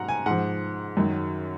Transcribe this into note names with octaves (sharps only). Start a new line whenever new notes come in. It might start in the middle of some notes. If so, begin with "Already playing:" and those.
Already playing: G#2 F#3 F#5 A#5
G#5
G#2 F3 F#5
F#2 D#3 F#3